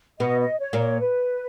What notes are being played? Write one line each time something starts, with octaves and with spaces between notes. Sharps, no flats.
B2 B3 D#5
D#5
C#5
A#2 A#3
C#5
B4